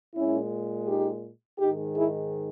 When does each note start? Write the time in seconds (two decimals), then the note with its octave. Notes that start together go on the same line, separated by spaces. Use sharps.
0.15 A#2 G#3 C#4 E4
0.87 D#4 G4
1.60 G#2 D#3 G#3 D#4 G4
1.96 E4 G#4